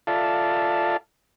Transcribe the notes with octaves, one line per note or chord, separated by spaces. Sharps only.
F4 A4 D5 E5 F5 A5